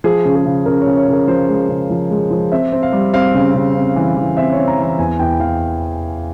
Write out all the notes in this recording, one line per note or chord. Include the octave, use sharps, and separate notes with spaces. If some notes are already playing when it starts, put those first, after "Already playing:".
F3 G#4
C#3
G#4
C#3
C#3 A#4
C#3 C#5
C#5
C#3 A#4
F3 C5
G#3
C#3
F3
G#3
F3
C4 E5
C4
F5
G3
C4 F5
C#3
C#3
C4
E3
E3
C4 E5
C#5
C4
A#5
E3
A#5
E2 G#5
E2 G5
E3 F5